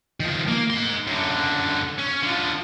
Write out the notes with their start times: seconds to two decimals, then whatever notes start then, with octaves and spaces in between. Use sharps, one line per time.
0.20 D#3 F3
0.48 A#3
0.70 D#4 C6
1.07 F#2 D3
1.98 C#4
2.22 D3 F3